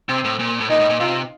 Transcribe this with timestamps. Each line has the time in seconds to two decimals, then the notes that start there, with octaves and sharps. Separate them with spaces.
0.09 C3 C4
0.24 A2
0.39 A#2
0.60 A2
0.70 A#2 D#4
0.80 A2
0.90 A#2
1.00 C3 F4